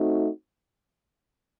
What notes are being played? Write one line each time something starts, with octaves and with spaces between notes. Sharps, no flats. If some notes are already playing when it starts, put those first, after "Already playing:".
Already playing: A3 C4 D#4 F#4